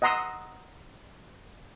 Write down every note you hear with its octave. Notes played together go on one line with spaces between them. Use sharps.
D#5 F#5 A#5 C6 D#6 E6